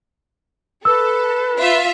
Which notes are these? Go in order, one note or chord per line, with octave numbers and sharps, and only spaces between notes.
A4 B4 E6
F4 E5